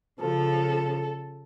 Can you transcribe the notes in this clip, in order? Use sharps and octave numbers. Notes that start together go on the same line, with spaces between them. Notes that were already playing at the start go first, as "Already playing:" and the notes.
C#3 F3 A4